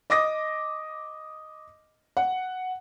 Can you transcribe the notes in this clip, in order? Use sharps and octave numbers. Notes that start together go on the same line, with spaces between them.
D#5 D6 D#6 A#6
F#5